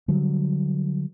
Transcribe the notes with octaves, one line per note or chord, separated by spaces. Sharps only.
D3 F#3 G3